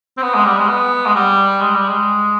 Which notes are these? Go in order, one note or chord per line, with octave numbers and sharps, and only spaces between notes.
C4
B3
G#3
G3
G#3
B3
G#3
G3
G#3
G3
G#3